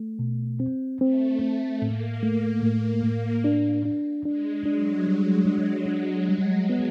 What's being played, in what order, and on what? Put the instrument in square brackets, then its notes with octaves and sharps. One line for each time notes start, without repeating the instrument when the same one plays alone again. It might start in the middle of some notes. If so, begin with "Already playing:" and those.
Already playing: [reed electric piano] A3
B2
C4
[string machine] A3 [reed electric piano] C4
[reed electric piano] C4
[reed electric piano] A2 [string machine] A#3
[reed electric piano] A3
A2
A2
D4
D4
[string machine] G#3 [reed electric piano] D4
[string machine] F#3 [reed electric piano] D4
[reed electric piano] G3
D4
D4
G3
B3